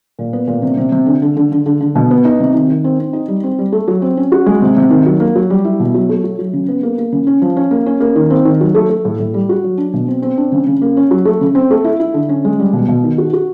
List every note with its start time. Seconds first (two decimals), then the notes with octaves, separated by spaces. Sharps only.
0.19 A#2
0.33 B3
0.47 A#2
0.62 C3
0.77 C3
0.92 C3
1.06 D3
1.22 D3
1.37 D3
1.52 D3
1.66 D3
1.81 D3
1.95 B2
2.11 B3
2.25 D#4
2.40 C3
2.54 D#3
2.69 D#3
2.84 C4
2.99 C4
3.13 D#4
3.28 G3
3.43 C4
3.59 G3
3.72 A3
3.88 F#3
4.02 C4
4.17 C#4
4.32 F#4
4.46 G#3
4.62 C3
4.77 C3
4.90 D#3
5.06 F#3
5.20 A#3
5.35 F#3
5.50 G3
5.65 E4
5.80 B2
5.94 F#3
6.09 A3
6.24 F#3
6.39 F#3
6.53 C#3
6.69 B3
6.83 A#3
6.98 A#3
7.12 C#3
7.27 C#4
7.42 F3
7.57 C#4
7.71 A#3
7.86 C#4
8.00 A#3
8.16 D#3
8.30 C4
8.45 D#3
8.61 F#3
8.75 A3
8.90 A3
9.05 A2
9.20 A2
9.34 G3
9.49 F#4
9.64 F#3
9.78 D4
9.94 B2
10.08 C4
10.22 C4
10.37 D4
10.52 C#3
10.66 C#3
10.82 A#3
10.97 C#4
11.11 F#3
11.25 A3
11.41 C#3
11.55 C4
11.71 A3
11.84 E4
12.00 E4
12.14 D3
12.29 C#4
12.45 G#3
12.59 G3
12.73 B2
12.88 B2
13.04 D#3
13.18 F#4
13.33 F#4